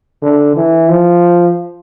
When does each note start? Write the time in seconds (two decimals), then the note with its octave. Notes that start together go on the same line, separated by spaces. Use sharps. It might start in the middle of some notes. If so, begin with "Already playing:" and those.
0.22 D3
0.56 E3
0.89 F3